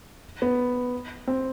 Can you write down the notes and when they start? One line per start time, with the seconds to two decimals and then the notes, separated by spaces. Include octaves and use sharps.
0.42 B3
1.27 C4